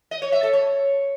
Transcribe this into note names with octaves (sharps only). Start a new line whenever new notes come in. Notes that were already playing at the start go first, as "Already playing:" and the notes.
D#5
C#5
E5
A4
C#5